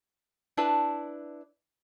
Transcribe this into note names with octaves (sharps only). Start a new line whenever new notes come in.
D4 E4 B4 A5